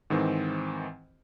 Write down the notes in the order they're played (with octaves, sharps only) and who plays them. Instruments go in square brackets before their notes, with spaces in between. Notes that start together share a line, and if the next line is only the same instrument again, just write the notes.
[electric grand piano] G#2 D#3 E3 C4